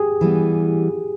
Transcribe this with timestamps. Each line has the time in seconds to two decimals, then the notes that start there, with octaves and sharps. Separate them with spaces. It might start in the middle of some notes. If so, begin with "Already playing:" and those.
Already playing: G4 G#4
0.21 E3 G3 B3